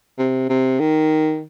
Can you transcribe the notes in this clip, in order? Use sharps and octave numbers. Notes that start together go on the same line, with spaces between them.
C3
C3
D#3